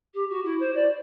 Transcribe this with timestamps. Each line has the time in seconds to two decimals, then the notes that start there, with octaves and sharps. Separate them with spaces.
0.14 G4
0.29 F#4
0.44 E4
0.60 C5
0.75 D5